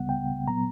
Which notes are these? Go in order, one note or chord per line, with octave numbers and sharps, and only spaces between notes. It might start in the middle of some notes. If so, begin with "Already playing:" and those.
Already playing: C#2 C#3 G3 B3 F#5
G5
A#2 F#3 B3 A#5